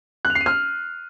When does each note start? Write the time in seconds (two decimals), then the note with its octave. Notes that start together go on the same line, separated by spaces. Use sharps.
0.25 F#6
0.30 F7
0.35 C7
0.41 D#7
0.46 F6